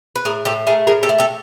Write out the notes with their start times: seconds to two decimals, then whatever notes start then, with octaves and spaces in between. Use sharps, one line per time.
0.16 B4
0.25 A2 G#4 A#4
0.45 A2 G4 A4
0.67 A3 G#4 A#4
0.87 A2 G#4 A#4
1.03 G4 A4
1.09 A3
1.18 G4 A4